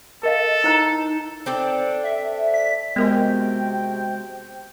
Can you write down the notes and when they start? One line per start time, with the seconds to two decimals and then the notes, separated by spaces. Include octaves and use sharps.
0.23 A4 A#4 D#5 F5
0.64 D#4 E4 C5 A#5
1.46 C4 D4 A4
2.04 E5
2.54 B6
2.96 C3 G#3 B3 F#4 A#4 D#5 G5